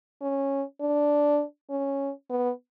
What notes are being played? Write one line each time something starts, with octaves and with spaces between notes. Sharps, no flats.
C#4
D4
C#4
B3